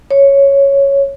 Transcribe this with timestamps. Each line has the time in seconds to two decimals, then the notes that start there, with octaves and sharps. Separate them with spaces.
0.11 C#5